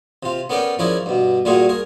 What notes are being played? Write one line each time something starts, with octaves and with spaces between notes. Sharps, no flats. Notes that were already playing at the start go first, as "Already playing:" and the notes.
C3 F4
B3 C#4 A4 A#4 D5 G5
F3 C#4 E4 G#4 A#4 D5
G2 B2
A#2 G3 A3 F4 F#4 G#4
G#4 A#4